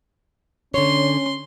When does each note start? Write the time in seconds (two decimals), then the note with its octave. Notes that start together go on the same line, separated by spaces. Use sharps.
0.74 D3 C#4 C#5 C6